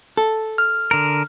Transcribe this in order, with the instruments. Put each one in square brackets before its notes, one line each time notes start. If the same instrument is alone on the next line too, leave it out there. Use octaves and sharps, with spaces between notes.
[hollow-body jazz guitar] A4
[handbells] F6
[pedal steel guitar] D3 A#4